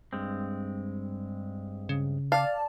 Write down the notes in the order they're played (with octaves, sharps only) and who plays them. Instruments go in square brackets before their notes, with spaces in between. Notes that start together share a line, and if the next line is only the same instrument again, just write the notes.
[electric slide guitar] G2 G#3 C4
[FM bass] C#3
[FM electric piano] D5 A5 [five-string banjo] F5